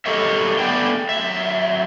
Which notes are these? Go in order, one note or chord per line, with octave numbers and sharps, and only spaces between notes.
G4 A4 A#4 C#5 D#5 E5
A3 B3 D4 G#4 B4 G5
F#3 E5